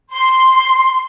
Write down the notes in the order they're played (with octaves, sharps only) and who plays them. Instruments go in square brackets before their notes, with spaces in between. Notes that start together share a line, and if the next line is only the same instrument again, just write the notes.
[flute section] C6